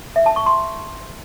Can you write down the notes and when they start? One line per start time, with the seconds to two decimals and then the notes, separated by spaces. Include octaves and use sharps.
0.16 E5
0.26 A5
0.36 C#6
0.46 C6